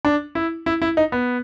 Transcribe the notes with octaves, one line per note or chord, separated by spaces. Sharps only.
D4
E4
E4
E4
D#4
B3